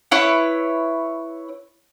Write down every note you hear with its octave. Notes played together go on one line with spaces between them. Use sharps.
E4 B4 C#5